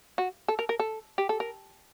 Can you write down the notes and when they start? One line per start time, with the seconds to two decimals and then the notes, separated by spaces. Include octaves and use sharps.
0.18 F#4
0.48 A4
0.59 A#4
0.69 A#4
0.79 A4
1.18 G4
1.29 A4
1.40 A#4